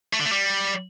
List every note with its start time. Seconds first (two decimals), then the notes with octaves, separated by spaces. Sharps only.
0.13 A3
0.19 D3
0.25 A3
0.32 G3